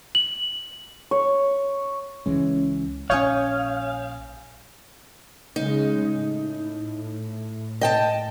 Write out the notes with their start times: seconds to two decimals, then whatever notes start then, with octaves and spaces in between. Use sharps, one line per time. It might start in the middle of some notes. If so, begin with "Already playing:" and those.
0.15 F#7
1.11 C#5
2.26 C#2 E3 G#3 C#4
3.10 A#1 E3 C#4 C#5 F5 G#5 D#6 G6
5.56 C#3 G#3 D#4
6.13 A2
7.81 D#5 G5 A5